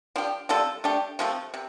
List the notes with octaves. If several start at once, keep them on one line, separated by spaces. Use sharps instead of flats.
F3 D4 G4
C3 G3 F4 A4
A3 D4 G4
C3 F3 A3
C3